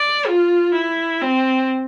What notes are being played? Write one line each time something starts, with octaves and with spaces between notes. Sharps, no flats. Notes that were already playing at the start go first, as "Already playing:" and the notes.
Already playing: D5
F4
E4
C4